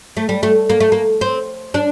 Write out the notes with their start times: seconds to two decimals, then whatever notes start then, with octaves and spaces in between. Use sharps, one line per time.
0.17 A3
0.29 G3
0.43 A3
0.70 A#3
0.80 A3
0.92 A#3
1.21 C4
1.74 D4